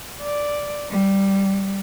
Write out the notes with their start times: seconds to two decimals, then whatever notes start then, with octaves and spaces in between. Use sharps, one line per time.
0.22 D5
0.91 G3